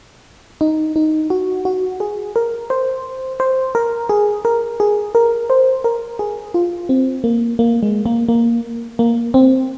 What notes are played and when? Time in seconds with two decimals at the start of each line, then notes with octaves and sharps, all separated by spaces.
0.61 D#4
0.96 D#4
1.30 F#4
1.65 F#4
2.00 G#4
2.36 A#4
2.70 C5
3.40 C5
3.75 A#4
4.09 G#4
4.45 A#4
4.80 G#4
5.15 A#4
5.50 C5
5.84 A#4
6.19 G#4
6.54 F4
6.89 C4
7.24 A#3
7.59 A#3
7.83 G#3
8.06 A#3
8.28 A#3
8.99 A#3
9.34 C4